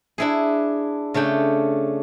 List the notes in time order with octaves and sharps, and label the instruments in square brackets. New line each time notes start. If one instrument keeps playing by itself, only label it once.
[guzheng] D4 E4 G#4
C#3 A3 D4 G5